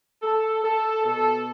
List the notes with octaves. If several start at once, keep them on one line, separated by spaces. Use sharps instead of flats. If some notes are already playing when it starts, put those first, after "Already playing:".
A4
A4
B2 A4